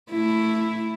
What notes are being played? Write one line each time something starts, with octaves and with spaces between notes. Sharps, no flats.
A3 E4